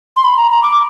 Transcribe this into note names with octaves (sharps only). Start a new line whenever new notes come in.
C6
B5
A#5
A#5
D6